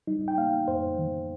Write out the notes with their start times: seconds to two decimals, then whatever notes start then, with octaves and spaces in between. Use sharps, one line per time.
0.07 G3 D#4
0.28 G5
0.38 A#3 F5
0.68 F2 C5
0.99 D#3